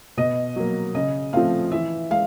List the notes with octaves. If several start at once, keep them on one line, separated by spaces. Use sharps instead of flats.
B2 D#5
F#3 A#3
C#3 D#5
F3 A3 C4 F5
E3 E5
G#3 F5